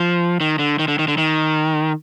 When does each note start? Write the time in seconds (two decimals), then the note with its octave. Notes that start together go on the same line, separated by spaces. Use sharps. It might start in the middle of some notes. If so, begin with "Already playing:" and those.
Already playing: F3
0.40 D#3
0.59 D3
0.79 D#3
0.88 D3
0.99 D#3
1.08 D3
1.18 D#3